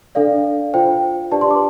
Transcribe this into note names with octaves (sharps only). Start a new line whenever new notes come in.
D4 A4 D5 F5
F4 C5 G5
D4 G4 B4 D5 A5
C6
D6